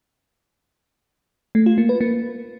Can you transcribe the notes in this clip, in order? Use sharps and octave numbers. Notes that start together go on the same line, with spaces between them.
A3
F4
A#3
B4
A#3